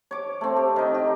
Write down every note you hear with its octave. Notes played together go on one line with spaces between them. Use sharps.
C#5 D6
A3 C4
G4
D#3 D#4
G4